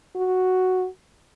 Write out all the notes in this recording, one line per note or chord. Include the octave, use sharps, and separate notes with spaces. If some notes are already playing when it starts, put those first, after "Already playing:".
F#4